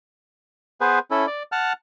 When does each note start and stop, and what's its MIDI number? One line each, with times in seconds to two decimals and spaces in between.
0.81 0.99 59
0.81 0.99 68
0.81 0.99 71
0.81 0.99 72
1.11 1.26 61
1.11 1.26 64
1.11 1.26 69
1.27 1.43 74
1.52 1.73 78
1.52 1.73 81
1.52 1.73 89